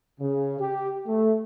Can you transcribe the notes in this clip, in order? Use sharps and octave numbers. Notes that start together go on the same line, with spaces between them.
C#3
G4
A3